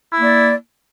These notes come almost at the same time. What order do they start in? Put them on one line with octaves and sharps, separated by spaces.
E4 A#3 D5